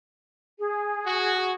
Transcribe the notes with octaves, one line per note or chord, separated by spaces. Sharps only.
G#4
F#4